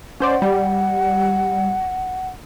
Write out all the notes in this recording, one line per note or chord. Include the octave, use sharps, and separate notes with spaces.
C#4 C5 D5 F#5
G3